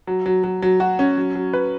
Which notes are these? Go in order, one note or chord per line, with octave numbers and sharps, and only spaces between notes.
F#3
F#3
F#3
F#3
F#4
C#4
F#3
F#3
B4